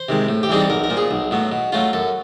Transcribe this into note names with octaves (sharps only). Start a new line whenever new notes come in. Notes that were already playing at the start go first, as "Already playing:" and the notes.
Already playing: C5
C3 D#3 G#3
A2
G4
E3 G3 C4 D#4 G#4
A4
B1 A#4
A#4
A#2 F3
G#4
B1
A2 F#3 B3
B2
F#3 A3 C#4 F4
F#2 A4